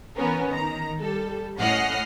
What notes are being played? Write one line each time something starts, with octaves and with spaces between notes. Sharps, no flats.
E3 B3 C#4 A#4
D#3 A#5
G3 A4
A2 C#4 D#5 F#5 F6 C7